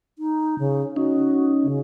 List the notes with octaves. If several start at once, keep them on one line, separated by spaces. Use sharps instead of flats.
D#4
C#3
C#4 D#4 F#4
C#3